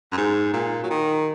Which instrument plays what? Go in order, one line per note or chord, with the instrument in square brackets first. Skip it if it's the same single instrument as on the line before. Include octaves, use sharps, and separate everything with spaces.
[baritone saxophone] F#2
G#2
A#2
F#3
D#3